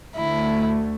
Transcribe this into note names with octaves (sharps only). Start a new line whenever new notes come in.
D2 A3 E4